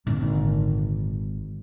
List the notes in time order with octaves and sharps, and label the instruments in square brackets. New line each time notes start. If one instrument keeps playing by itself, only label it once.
[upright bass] G#1 [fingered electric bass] A#2 D3